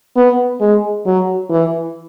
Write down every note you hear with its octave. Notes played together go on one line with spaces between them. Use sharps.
B3
G#3
F#3
E3